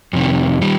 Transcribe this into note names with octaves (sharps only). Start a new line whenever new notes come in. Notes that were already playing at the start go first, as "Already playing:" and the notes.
F2 C3 D#3
D#3 G3